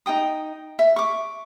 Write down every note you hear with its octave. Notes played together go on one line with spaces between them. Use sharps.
D#4 A4 G5 D#6
E5
C#6 D6